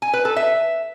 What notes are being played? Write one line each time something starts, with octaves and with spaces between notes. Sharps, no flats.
G#5
B4
A4
E5